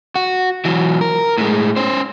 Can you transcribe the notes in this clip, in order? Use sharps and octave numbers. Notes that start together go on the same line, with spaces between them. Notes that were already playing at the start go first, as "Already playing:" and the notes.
F#4
E3 F#3
A#4
A2 G#3
C#4 C5